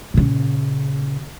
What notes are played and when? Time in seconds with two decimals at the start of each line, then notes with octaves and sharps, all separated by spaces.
0.14 A#2 C#3